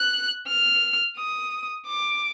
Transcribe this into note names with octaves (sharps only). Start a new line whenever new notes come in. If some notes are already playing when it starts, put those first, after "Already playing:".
Already playing: F#6
F6
D#6
D6